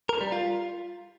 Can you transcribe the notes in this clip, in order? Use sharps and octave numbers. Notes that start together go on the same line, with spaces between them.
A#4
G3
F4